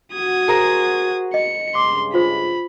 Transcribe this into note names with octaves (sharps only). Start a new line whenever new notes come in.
F#4 D#6 G#6
G#4 A#4 C5
D#5 C#7
G2 C#3 G#3 C6 D6
F4 C5 B5